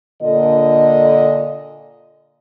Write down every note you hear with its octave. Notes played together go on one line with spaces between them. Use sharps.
A#2 D3 D#5